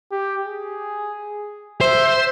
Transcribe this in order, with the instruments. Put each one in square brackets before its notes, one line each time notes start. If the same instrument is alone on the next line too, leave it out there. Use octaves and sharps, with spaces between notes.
[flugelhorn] G4
G#4
[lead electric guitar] C5 [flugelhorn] E5